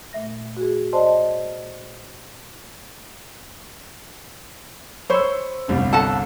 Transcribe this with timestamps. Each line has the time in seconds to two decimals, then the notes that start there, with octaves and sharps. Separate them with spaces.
0.13 A#2 A3 E5 A#6
0.57 F#4 G#4
0.93 C5 D5 D#5 A5 C6
5.10 C5 C#5 B5 C#6 E6
5.68 G1 C2 G3
5.93 A4 F#5 A5